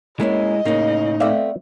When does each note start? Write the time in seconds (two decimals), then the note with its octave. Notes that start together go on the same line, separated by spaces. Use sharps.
0.20 G#3 A#3 B3 C#4 E4 D#5
0.65 A2 C#3 A#3 D#4
1.20 A3 B3 C4 D5 E5 F5